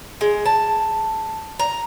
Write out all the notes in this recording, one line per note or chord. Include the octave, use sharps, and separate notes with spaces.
G#3
A5
A#5